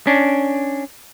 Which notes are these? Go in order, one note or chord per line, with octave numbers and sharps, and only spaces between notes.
C#4 D4